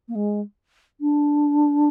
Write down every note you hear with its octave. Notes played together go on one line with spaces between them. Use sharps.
A#3
G#3
D4